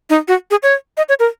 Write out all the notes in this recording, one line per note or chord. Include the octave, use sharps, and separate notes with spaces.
D#4
F#4
G#4
C#5
D#5
C#5
A#4